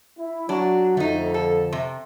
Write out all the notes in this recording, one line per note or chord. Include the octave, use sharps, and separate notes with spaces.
E4
F#3 D4 F#4
F2 D3 A3 D#4
A4
C3